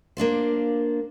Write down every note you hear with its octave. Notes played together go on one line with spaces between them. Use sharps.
A#3 D4 F4 C5